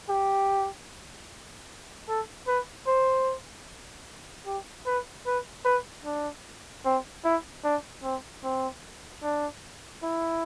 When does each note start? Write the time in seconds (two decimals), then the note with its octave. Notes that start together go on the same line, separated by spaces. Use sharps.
0.09 G4
2.08 A4
2.47 B4
2.87 C5
4.46 G4
4.86 B4
5.26 B4
5.65 B4
6.04 D4
6.85 C4
7.24 E4
7.64 D4
8.03 C4
8.44 C4
9.23 D4
10.03 E4